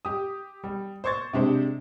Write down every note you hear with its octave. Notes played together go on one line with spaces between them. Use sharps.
G4 D#6
G3
C5 C6 C#6 G#6 A6
C3 G#3 D4 G4 C5